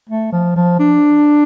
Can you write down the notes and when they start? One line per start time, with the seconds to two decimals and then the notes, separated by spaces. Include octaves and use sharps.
0.10 A3
0.33 F3
0.56 F3
0.80 D4